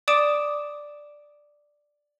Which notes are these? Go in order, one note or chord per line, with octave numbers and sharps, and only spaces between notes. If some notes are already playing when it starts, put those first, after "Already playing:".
D5 D6 D#6 D7 E7